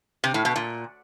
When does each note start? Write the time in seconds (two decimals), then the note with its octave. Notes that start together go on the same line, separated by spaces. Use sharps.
0.24 C3
0.34 A2
0.45 B2
0.56 A#2